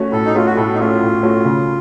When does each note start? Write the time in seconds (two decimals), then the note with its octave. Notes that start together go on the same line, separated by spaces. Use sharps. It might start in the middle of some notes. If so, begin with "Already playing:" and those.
Already playing: A3 C#4 F#4
0.12 A2 A4
0.26 D#4
0.34 A3 C#4 F4 F#4
0.46 F#4
0.56 A2 A4
0.74 D#4
0.79 A3 C#4 F4 F#4
1.01 A2
1.23 A3 C#4 F#4
1.45 C#3